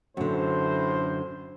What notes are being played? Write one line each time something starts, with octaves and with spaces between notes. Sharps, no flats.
A1 F#2 A2 D3 C5